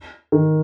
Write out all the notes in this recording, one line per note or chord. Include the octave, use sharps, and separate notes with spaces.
D#3